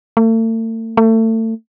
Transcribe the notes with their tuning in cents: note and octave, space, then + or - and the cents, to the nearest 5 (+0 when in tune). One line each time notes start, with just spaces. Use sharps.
A3 +40
A3 +30